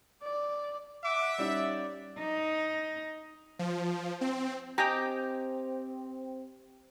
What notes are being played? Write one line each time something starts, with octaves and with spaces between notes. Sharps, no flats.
D5
E5 F#5 D6
G3 C#4 D#4 D5
D#4
F3
C4
C4 G4 D#5 G5 G#5 A#5